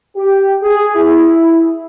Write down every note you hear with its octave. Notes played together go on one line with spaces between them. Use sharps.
G4
G#4
E4